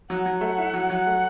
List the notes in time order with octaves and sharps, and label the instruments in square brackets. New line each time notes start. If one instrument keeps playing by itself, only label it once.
[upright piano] F#3 [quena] F#5
[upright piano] F#3
A3
E4
F#3
F#3
A3